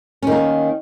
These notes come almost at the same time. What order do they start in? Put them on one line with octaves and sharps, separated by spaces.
C#4 D#3 A#3